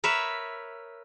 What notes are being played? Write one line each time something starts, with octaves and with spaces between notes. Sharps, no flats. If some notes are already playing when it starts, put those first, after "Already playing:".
A#4 B4 C#5 E5